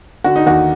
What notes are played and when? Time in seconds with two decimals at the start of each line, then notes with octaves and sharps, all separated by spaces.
0.24 D3 F#4
0.36 D#4
0.46 D#2 F#4